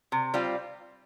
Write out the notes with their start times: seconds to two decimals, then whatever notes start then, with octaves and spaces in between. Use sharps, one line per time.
0.12 C3
0.34 G3 C4 F4